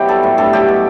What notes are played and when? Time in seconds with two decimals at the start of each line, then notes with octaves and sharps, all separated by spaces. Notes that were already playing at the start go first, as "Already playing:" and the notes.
Already playing: B2 F#3 E4 G4
0.08 G3 A4
0.23 A2
0.38 G2 A4
0.53 F#3 G4
0.68 B2